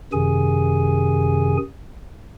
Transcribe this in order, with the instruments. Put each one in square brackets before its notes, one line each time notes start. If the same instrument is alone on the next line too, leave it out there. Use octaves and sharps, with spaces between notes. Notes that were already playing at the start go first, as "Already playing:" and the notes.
[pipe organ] F#2 C3 D#3 G#4 G#5